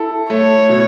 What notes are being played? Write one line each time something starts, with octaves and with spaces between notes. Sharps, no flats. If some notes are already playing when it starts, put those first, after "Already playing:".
Already playing: E4 A4
A3 C#5
B2